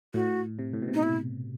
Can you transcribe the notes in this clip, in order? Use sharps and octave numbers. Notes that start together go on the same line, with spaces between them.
A2 F#4
C3
A2
B2
C3
D#4
E4